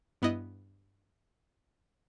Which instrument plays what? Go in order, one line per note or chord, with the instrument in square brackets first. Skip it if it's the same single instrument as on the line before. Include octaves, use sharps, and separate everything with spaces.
[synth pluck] G2 B3 E4 D#5 F#6